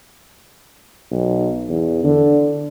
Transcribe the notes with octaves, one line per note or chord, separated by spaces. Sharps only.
B1
E2
D3